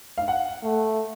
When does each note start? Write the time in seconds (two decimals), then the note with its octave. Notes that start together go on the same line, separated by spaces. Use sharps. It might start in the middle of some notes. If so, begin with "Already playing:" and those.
0.18 F5
0.28 F#5
0.63 A3